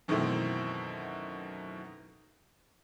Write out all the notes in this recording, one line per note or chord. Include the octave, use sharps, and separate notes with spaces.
F#2 B2 D#3 E3 A3 C4